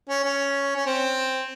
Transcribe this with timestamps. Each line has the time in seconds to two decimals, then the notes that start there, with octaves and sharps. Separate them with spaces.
0.09 C#4
0.24 C#4
0.76 C#4
0.86 C4